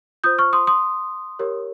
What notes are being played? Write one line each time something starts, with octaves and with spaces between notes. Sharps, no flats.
F4 C5 D#6 G6
C#6 F6
C6 D#6
C6 D#6
G4 A#4 C#5